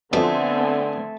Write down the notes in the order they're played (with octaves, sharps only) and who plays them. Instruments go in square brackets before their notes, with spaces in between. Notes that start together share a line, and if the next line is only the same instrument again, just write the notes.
[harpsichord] F2 B2 [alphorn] D3 [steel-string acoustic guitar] A3 [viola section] B3 C4 G#5